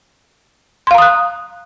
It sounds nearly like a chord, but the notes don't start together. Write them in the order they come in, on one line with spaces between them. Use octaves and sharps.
C6 F5 A#5 D#6 F#6